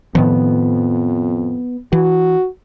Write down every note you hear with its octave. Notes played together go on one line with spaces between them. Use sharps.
F2 A2 D#3 F3 B3
E3 F#4